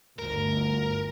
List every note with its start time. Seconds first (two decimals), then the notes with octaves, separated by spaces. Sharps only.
0.19 G1 D2 A#4